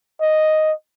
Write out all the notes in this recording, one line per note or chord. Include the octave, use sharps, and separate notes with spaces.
D#5